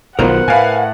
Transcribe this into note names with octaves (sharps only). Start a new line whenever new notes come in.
B1 D#3 F3 B3 A#4 C5 F#5
A2 B4 F5 G#5